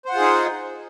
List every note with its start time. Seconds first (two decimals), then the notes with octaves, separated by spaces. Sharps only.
0.06 C5
0.09 F#5
0.13 F4
0.16 G#4
0.20 D#4